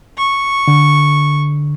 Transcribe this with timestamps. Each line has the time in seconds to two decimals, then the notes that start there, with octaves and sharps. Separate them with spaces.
0.18 C#6
0.68 D3